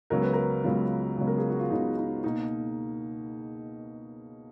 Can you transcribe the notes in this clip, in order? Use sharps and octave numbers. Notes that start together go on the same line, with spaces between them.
C#2 C#3 F#3 B3 A#4
B4
A#4
C#2 C#3 F#3 B3 F4
C#2 C#3 F#3 B3
A#4
G#4
F#4
F4
C#2 C#3 F#3 B3 D#4
D#4
B2 A#3 D#4